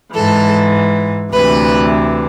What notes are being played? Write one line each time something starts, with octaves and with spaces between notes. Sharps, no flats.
G#2 E3 A4
D2 C3 E3 B4